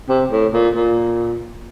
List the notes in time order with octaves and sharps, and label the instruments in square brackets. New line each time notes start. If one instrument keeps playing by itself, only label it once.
[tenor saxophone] C3
A2
A#2
A#2